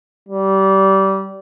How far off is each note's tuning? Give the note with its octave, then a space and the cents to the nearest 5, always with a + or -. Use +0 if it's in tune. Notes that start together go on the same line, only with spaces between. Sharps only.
G3 -25